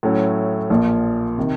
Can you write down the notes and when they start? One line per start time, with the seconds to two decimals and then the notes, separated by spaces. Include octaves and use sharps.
0.03 A2 F#3 A3 C#4
0.70 A#1 A#2 F3 A#3
1.38 C3 D#3